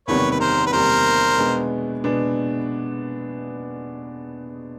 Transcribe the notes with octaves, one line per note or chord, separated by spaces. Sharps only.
F#1 E2 C3 D#3 G3 B4 C#5
B4
A#4 C5
B4
F#1 E2 C3 D#3 G3 A#4 C5
B2 G#3 B3 D4
B2 G#3 B3 D4